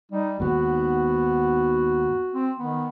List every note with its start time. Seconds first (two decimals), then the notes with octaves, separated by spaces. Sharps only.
0.12 G3 D#4
0.40 D#2 G#2 B3 F#4
2.34 C4
2.59 D#3 B3